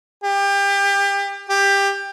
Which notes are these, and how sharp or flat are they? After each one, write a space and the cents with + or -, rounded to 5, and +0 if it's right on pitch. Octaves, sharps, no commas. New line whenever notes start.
G4 +30
G4 +20